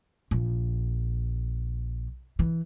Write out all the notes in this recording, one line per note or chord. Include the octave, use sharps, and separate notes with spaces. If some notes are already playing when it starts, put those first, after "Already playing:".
A#1
E3